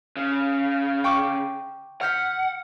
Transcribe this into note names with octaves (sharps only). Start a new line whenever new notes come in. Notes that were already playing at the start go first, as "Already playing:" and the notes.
C#3
G5 C#6 D6
F#5 F6 G6 B6